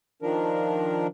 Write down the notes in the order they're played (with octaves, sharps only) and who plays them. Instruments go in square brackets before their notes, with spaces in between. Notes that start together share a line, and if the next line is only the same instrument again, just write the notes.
[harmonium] D#3 F3 D4 A#4